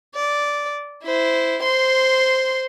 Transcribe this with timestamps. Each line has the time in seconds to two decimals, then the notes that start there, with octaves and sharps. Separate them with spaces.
0.15 D5
1.04 E4 C5
1.63 C5 C6